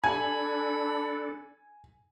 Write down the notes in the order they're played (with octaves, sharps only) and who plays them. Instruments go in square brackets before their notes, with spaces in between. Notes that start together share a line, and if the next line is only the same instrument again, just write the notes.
[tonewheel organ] D4 A4 [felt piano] G#5 [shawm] B5 [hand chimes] G#6